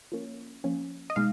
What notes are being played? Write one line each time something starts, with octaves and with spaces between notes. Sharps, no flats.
F3 A#3 C#4
F3 A#3 C#4
D#5
B2 G#3 D#4 F5